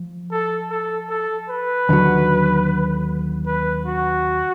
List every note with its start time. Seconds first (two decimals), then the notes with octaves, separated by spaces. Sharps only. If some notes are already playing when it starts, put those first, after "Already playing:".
Already playing: F3
0.31 A4
0.70 A4
1.10 A4
1.50 B4
1.89 D#2 D3 F#3
3.47 B4
3.86 F#4